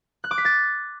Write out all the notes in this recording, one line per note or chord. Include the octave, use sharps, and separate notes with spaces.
F#6
D6
B6
A6